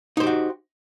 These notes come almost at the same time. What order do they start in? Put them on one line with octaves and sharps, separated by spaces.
D#4 C5 G4 F#4